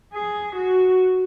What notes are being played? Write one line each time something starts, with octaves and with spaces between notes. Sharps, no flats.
G#4
F#4